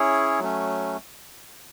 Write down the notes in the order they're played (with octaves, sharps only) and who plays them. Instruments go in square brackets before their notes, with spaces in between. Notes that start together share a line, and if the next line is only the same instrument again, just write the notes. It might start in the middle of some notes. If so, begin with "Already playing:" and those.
Already playing: [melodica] C#4 E4 G#4 C#5
F#3 A3 C#4